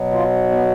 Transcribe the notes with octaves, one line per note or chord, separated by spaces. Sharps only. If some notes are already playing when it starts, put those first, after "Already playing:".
Already playing: B2 F#3
F4
B3